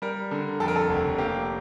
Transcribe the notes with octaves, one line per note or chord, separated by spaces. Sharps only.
G3 A#4
D3
F2 A4
A#4
A4
F1
A#3 G4